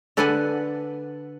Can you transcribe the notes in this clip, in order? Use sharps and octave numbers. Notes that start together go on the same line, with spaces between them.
D3 A4 B4 D5 F#5 G#5